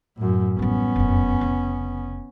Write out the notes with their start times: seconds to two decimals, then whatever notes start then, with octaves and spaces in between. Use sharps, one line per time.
0.17 F#2 A2
0.59 A1 G3 B3 C#4
0.96 F1 F#2
1.41 F1 C#3